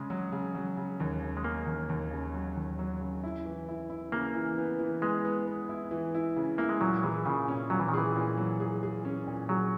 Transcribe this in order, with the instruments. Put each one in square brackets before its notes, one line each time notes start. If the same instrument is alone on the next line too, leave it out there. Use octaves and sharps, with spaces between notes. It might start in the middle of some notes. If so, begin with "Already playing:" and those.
Already playing: [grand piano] C#3 C#4 [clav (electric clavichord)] G#3
[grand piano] F#3
C#3
F#3
C#3
D#2
C#3
[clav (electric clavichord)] G#3
[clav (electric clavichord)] A#3 [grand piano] C#4
[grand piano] D#2
D#2
C#3
F#3
D#2
F#3
C#3
E4
E3
E4
E4
[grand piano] C#3 [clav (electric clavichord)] A#3
[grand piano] E3
B3
E3
[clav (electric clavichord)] G#3 [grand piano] B3
[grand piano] B3
B3
E4
E3
E4
C#3
[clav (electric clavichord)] A#3 [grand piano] E4
[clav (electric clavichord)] G#3
[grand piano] A#2 [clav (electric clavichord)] F#3
[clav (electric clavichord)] E3 [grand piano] G#4
[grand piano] A#2 [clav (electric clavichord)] C#3
[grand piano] C#4
[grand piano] A#2 [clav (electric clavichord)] F#3
[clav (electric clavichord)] E3
D#3
[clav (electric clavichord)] E3 [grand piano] G#4
[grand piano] A#2
F#3
G#4
G#4
C#4
A#2
[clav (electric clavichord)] F#3 [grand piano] G#4